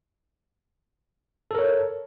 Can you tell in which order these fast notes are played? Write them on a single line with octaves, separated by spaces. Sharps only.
A4 A#4 C#5